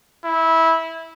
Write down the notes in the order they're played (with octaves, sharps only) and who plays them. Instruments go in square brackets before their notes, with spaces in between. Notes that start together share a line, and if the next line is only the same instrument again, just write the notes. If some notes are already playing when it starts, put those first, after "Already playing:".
[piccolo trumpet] E4